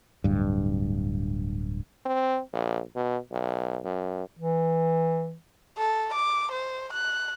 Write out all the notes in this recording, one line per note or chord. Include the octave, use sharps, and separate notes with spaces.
D1 G2
C4
A#1
B2
B1
F#2
E3
A4
D6
C5
F#6